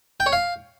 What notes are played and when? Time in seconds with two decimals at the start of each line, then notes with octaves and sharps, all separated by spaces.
0.20 G5
0.26 C#5
0.33 F5